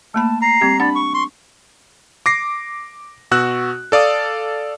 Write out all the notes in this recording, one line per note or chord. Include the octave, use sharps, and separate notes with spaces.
A3 A#3 A5 B5
A#5 C7
G3 C4 G4
D4 D5 F#5 A5 B5
C#6
C6 C#6
D6 A#6 C7
B2 F#4 E6 F#6
A4 D5 F5 D#6